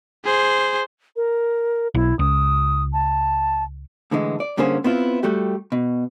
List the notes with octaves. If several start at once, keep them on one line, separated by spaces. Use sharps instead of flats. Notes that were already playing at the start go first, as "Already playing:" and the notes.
G#4 C5
A#4
B1 E4
C#2 D#6
A5
A2 D3 E3 G#3
D5
G2 D3 A#3 C#4 G#4 C5
B3 C4 E4 F4
G3 A3 F#4 G4
B2